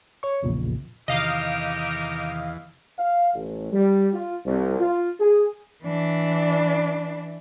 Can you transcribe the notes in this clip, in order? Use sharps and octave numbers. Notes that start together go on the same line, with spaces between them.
C#5 C#6
A#1 E2 A#2 C#3
E2 C3 D#3 D#4 G4 A#4 D#5 F5
F5
A1
G3
F4
C2
F4
G#4
E3 D4